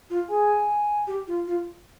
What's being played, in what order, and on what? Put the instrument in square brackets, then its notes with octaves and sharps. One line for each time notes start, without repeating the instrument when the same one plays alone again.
[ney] F4
[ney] G#4 [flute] G#5
[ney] G4
F4
F4